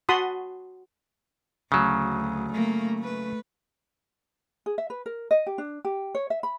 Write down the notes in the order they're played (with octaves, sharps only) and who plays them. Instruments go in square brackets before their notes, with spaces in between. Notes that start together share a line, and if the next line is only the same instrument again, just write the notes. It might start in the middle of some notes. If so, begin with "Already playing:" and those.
[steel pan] F#4 F#5 A5 B5 C6 D#6
[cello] D2 [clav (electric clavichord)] C#3 F#3
[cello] A3 A#3
A3 B4
[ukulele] G#4
E5
B4
A#4
D#5
G4
D4
G4
C#5
E5
B5